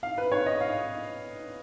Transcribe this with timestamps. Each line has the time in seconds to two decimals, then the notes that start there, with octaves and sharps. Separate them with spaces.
0.03 F5
0.18 B4
0.32 C#5
0.46 D#5
0.61 F5